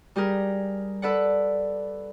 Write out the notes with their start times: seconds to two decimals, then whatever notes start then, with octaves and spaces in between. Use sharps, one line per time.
0.16 G3 G4 G#4 A#4
1.02 A4 B4 D5 F#5